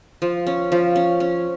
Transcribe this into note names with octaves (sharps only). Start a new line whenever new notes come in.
F3
C#4
F3
C#4
C#4